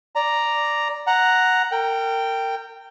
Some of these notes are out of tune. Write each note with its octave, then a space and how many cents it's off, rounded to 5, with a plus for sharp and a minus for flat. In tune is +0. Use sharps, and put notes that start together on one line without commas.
D5 +0 A#5 +0
F#5 +0 A#5 +0
A#4 -35 G5 +0